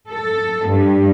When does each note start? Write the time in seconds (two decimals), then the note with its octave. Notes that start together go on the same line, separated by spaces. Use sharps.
0.11 A4
0.69 G2